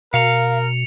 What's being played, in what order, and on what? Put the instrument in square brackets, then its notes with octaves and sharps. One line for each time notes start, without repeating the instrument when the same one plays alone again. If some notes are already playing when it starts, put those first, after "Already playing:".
[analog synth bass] B2 [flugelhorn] A#4 [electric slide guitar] F5 [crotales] C#7 F7